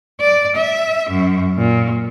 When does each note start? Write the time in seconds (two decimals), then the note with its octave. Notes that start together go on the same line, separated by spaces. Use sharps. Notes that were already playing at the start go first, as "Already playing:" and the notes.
0.20 D5
0.56 E5
1.10 F#2
1.58 A#2